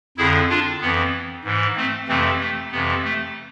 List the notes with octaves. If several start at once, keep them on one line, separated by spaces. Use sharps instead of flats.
F2 D3 E4 G#4
D4 F4
F2 E3 B3
G#2 E3
A3 C4
F2 C3 E3 A3 C4
A3
F2 C3 E3 B3
A3